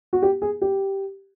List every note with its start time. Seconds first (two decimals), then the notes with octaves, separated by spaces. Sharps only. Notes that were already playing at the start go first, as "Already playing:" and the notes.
0.13 F#4
0.22 G4
0.42 G#4
0.62 G4